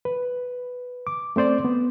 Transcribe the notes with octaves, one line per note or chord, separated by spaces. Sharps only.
B4
D6
A3 C4 C5 D5
B3